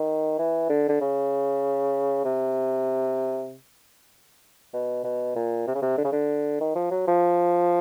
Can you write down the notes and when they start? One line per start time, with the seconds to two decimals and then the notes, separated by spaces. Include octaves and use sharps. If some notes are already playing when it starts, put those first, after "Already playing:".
Already playing: D#3
0.38 E3
0.69 D3
0.89 D3
1.01 C#3
2.25 C3
4.74 B2
5.04 B2
5.35 A#2
5.67 C3
5.75 C#3
5.82 C3
5.98 D3
6.04 C#3
6.12 D3
6.61 D#3
6.76 F3
6.91 F#3
7.07 F3